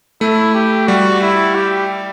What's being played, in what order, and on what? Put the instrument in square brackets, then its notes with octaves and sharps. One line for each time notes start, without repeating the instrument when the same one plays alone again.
[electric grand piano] A3 [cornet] E4
[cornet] G4
[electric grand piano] G3 [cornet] F#4
[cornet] E4
G4